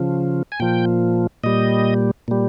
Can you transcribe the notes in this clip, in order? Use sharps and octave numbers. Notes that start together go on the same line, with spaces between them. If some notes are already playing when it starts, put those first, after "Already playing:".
Already playing: C#3 F3
G#5
A#2 F3 G5
A#2 G3 D#5
A#2 G3